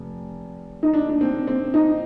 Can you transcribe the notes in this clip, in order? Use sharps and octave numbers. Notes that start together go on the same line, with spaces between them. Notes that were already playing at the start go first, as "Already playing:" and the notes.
Already playing: F1
D#4
D4
D4
C4
C4
D#4